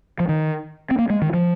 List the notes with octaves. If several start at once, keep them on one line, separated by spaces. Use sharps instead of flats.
F3
D#3
C4
A#3
G#3
D#3
F3